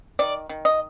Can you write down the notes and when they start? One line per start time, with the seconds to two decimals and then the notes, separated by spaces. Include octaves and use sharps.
0.19 D#3 D5
0.49 D#3
0.65 D#5